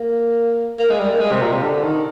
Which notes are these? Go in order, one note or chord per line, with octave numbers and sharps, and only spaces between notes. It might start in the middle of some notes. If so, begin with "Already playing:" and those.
Already playing: A#3
A#3
G#3
G3
A#3
G#3
C3
A#2
C3
D3
D#3